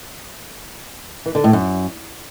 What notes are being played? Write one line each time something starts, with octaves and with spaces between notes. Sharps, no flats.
E3
D3
A2
F#2